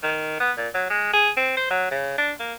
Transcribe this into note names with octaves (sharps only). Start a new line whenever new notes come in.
D#3
B3
A#2
F#3
G#3
G#4
C4
C5
F#3
C#3
D4
A#3